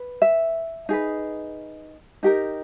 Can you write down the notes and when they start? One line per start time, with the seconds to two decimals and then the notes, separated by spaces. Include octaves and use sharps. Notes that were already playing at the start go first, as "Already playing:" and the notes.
Already playing: B4
0.22 E5
0.89 D#4 G#4 B4
2.23 D#4 G4 A#4